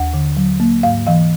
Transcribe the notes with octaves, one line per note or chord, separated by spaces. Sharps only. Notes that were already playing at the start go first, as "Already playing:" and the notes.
Already playing: D#2 F#5
D3
F#3
A#3
G#2 F5
E3 F5